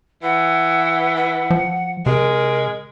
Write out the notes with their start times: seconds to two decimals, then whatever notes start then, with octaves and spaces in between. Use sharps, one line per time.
0.23 E3 F#5
1.16 F#5
1.50 F3
2.06 C3 G#3 A#4